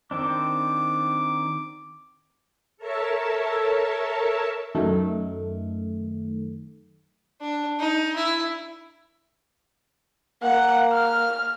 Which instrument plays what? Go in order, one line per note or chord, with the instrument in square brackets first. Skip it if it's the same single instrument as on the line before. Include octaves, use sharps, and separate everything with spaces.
[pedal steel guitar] D#3 C4 D4 [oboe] D6
[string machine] A4 A#4 C#5 E5 A5
[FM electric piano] F#2 D#3 A3
[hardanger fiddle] D4
D#4
E4
[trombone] A#3 [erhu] F#5
[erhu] F6